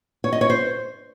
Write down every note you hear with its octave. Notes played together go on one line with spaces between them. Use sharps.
C#5
D#5
C#5
C5